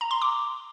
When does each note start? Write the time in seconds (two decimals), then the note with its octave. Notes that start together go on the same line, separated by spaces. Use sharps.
0.01 A#5
0.11 C6
0.22 D6